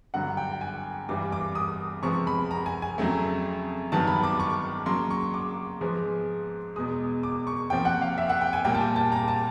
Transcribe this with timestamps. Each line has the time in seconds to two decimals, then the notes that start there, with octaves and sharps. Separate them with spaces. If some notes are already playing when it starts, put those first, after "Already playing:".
0.14 G2 D3 F#3 F#5
0.37 G5
0.61 G#5
1.09 G2 E3 G3 D6
1.32 D6
1.55 D#6
2.02 C3 F3 G#3 B3 C#6
2.27 B5
2.51 A#5
2.66 G#5
2.82 G#5
2.98 F2 C#3 F#3 A3
3.92 G2 D#3 F#3 B3 A5
4.07 B5
4.23 D6
4.40 C#6
4.86 C#3 F#3 A#3 C6
5.10 C#6
5.34 D6
5.81 G#2 F3 G#3 B3
6.76 E2 B2 G#3 D#6
7.23 D6
7.47 C#6
7.70 C3 F3 A#3 G5
7.85 F#5
8.02 F5
8.18 E5
8.29 F#5
8.41 G5
8.53 G#5
8.65 A#2 G3 A#3 G5
8.75 A5
8.81 G#5
8.96 A5
9.12 A#5
9.28 A5